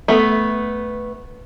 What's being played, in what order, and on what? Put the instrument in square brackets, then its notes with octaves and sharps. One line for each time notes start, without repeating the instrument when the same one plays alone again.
[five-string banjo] A3 B3